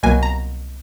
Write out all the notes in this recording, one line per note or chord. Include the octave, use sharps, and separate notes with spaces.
C2 B2 F#3 A#3 G#5
A#5